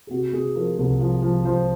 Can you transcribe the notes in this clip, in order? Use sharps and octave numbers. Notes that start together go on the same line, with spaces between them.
G#4
C3 F#4
C3 G#4
F3 A#4
C2
F3
F3
F3 C5